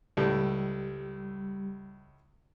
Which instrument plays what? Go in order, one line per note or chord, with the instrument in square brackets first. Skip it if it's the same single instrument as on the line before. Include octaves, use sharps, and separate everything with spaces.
[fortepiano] C#2 A2 [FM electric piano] G3